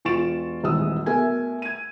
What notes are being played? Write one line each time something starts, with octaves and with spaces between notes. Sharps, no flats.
E1 F4 C#6 A6 D7 E7
D#1 G#1 G#2 E3 D#6 E6
B2 A3 A#4 E5 G#5 G#6
G#6 D#7